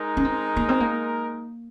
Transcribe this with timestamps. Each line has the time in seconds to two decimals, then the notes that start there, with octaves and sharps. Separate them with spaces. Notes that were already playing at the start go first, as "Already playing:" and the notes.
Already playing: G#3 D#4 A#4
0.17 C#4
0.25 C4
0.57 A#3
0.69 C4
0.80 A#3